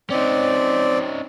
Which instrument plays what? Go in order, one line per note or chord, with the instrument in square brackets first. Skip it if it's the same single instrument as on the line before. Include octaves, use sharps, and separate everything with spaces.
[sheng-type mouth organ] C4 D5 [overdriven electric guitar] C#4 D#4